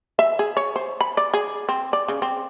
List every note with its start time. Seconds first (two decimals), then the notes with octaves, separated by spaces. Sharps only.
0.19 E5
0.39 G#4
0.57 C#5
0.76 C5
1.01 B5
1.17 D5
1.34 G#4
1.69 C4
1.93 D5
2.08 C#3
2.22 C4